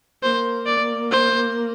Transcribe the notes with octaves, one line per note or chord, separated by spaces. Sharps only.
A#3 C5
D5
C5